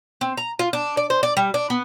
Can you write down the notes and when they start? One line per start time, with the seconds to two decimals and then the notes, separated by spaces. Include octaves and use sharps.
0.21 C4
0.37 A#5
0.59 F4
0.73 D4
0.97 D5
1.10 C5
1.23 D5
1.37 G3
1.54 D4
1.70 B3